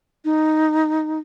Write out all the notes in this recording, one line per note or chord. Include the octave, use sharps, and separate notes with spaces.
D#4